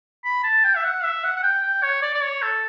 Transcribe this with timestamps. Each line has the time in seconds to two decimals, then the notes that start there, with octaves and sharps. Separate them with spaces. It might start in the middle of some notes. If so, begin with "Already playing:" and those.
0.24 B5
0.44 A5
0.64 G5
0.76 E5
0.84 F#5
1.04 E5
1.24 F#5
1.36 F#5
1.43 G5
1.63 G5
1.83 C#5
2.02 D5
2.14 D5
2.23 C#5
2.42 A4